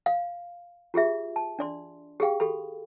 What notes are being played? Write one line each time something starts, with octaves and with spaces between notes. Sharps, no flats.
F5
F4 G4 G#4 E5
A5
D4 D5 C6
G4 G#4 F5 G5
F#4 G4 A4 B5